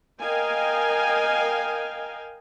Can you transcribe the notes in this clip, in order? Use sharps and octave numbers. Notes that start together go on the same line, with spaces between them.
A#4 D#5 F5 G5 G#5